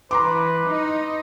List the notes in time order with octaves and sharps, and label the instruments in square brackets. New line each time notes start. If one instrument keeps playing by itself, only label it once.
[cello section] E3 [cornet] B4 [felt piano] A#5 C6 D6
[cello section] D#4